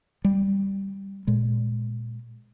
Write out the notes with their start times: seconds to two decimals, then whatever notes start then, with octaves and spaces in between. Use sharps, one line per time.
0.25 G3
1.27 A#2 G#3